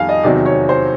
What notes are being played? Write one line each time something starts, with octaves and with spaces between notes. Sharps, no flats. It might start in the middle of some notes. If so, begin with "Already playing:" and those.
Already playing: F2 D#3 G3 F5 G#5
D#5
E2 C3 D#3 F#3 D5
C#5
C5